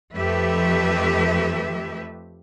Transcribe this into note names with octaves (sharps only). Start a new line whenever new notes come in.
F2 F3 A3 G4 B4 E5